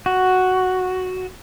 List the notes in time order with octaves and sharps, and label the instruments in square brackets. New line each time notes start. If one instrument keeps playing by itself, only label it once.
[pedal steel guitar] F#4